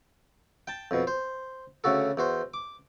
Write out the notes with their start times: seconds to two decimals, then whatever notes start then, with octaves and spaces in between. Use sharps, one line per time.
0.67 G5 A5
0.91 F2 B2
1.07 C5
1.84 D2 C#3 F#4 A4
2.17 E2 F#4 C5
2.54 D6